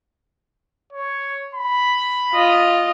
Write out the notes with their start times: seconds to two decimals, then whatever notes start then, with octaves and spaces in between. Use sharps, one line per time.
0.93 C#5
1.55 B5
2.33 F4 D#5